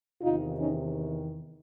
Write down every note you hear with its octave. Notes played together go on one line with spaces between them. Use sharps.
E2 C3 D#3 D#4 F4
C#4 D#4